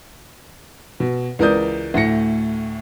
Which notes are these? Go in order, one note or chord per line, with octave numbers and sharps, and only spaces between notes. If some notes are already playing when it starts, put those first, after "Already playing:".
B2
C#2 E3 A#4 D5 D#6 G6
D2 A2 A3 A#6 C#7